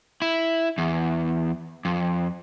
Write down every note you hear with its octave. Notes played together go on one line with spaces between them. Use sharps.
E4
E2
F2